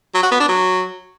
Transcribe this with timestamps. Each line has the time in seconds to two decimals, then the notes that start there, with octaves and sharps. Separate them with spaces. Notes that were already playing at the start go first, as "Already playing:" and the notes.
0.14 F#3
0.23 F#4
0.31 B3
0.40 D4
0.48 F#3